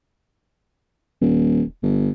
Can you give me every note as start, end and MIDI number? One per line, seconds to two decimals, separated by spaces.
1.21 1.62 27
1.83 2.10 31